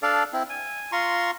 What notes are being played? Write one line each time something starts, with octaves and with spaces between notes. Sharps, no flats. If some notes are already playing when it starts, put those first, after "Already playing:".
D4 A4 D5 F5
C4 E4
G#5
F4 A#5 C6 C#6